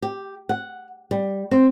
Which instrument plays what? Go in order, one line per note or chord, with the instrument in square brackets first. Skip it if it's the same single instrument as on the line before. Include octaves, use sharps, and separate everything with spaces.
[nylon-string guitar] G4
F#5
G3
C4